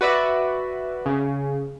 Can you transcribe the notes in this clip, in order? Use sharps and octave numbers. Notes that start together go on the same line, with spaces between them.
F#4 B4 D5 E5
C#3